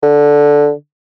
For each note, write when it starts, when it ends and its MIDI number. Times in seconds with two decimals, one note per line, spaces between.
0.03 0.72 50